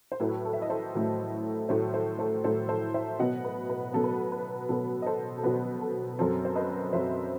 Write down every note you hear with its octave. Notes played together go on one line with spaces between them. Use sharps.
C5
A2 F#3 A3 E4 B4
A4
E5
D#5
A4 C5
A2 F#3 A3 E4
A2 F#3 A3 E4 A4 C5
A4 C5
A4 C5
A2 F#3 A3 E4 A4 C5
A4 C5
C5 E5
B2 F#3 B3 D#5 F#5
B4
B4
B2 F#3 B3 A4
B4
A4
B4
B2 F#3 B3 A4
D#5
A4 C5
A4
B2 F#3 B3 B4
A4
F#2 F#3 C4 A4
C5
B4 D#5
F#2 F#3 C4 C5 E5